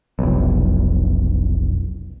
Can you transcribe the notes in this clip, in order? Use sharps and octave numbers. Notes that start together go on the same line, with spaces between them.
F1 B1